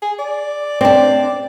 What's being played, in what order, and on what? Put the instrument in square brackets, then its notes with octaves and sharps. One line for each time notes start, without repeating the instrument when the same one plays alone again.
[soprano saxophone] G#4
D5
[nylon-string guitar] C4 D4 [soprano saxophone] D5